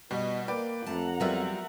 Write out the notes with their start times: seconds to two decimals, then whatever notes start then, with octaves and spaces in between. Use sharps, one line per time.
0.11 B2 G3 B3 D#5
0.48 A#3 A#4 B4 D5 G5
0.86 F2 A3 F#5 A5 A#5
1.20 F#3 G3 B3 F4 A#4 E5